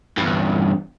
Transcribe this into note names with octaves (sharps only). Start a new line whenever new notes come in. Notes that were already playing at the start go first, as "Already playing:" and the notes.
E2 G2